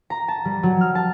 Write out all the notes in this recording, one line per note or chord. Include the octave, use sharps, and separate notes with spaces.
A#5
A5
G3
F#3
F6
A5